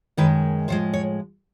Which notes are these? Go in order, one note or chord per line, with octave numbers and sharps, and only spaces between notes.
F#2 D#3 G#3 B4
A2 F3 G#3 C5
C#5